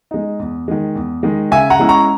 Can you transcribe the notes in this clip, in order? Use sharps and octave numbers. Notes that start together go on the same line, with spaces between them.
G#3 D#4
E2
D#3 G#3
E2
D#3 G#3
C#3 E5 G#5
F#5 A#5
G#3 C#4 E4
A#5 C#6